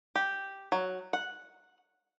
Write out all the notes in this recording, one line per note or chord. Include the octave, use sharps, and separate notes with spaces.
G4
F#3
F#5